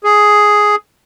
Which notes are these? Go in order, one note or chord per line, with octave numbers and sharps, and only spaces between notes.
G#4